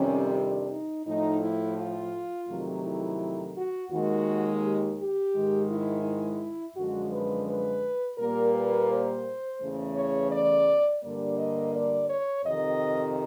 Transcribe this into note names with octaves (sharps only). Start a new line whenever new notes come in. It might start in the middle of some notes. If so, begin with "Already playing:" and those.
Already playing: F2 C3 D#3 G3 C#4
D4
D#4
A2 F3 A3 D#4
E4
F4
F2 C3 D#3 F#3 A3
E4
F#4
D#2 D#3 G#3 F#4
G4
G4
G#2 D#3 G#3
E4
E4
F#2 D3 F3 G#3 F#4
B4
B4
A#2 G3 A#3 A#4
B4
C5
E2 C#3 E3 A3
C#5
D5
G2 D3 G3 A#3 D5
D#5
D5
C#5
F2 C3 D#3 D#5